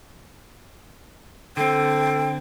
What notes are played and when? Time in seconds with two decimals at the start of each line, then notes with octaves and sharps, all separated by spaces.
1.57 D3 C4 A4 G5